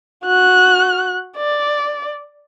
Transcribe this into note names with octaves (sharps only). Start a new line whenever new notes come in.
F#4 F#6
D5